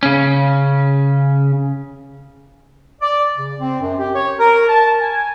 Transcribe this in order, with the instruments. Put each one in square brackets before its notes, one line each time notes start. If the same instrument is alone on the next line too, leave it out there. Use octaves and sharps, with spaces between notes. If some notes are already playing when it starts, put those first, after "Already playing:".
[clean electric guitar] C#3 C#4
[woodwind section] D5
C#3
C4
F#2
G4
C#5
A#4
A5
G#5